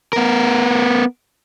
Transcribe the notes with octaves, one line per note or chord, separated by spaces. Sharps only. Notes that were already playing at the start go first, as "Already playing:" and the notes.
B3 A#4